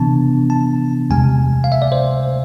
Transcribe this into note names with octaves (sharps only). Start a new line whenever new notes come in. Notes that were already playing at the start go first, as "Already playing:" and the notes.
Already playing: C3 E3 B3 D4 A5
A5
E2 C3 G#3 G#5
F5
E5
D5
C5